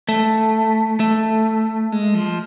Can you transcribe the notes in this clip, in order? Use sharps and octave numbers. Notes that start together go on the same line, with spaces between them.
A3
A3
G#3
F3